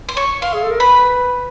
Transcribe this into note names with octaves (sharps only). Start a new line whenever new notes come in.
C6
C#5 C#6
F5 C6
G#4
A4
A#4
B4 B5